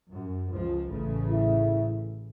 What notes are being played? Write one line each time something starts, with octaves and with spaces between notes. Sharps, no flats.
F#2
C#2 F3
A1 C#3 A3
E4